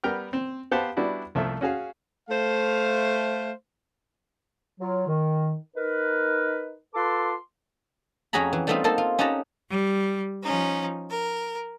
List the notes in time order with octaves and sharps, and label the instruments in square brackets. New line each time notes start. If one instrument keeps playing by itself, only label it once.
[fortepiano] G3 B3 A#4 G5 F6
C4
B3 G4 C5 F5 F#5 A5
G3 B3 D4 E4 F#4
C2 F3 A3 E5
C#4 F#4 G#4 F5
[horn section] A3 C5 F5
[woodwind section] F#3 F4
D#3
D#4 A#4 B4
F4 A4 B4 A5 C6 D6
[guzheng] F2 C#4 F#4 G#4 A#5 B5
E3
G3 A3 B3 C4 D#4 F4
A#3 D#4 A4 C5 A5
F4
C#4 D#4 G4 F#5 A5 A#5
[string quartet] G3
F3 C#4 D#4
A#4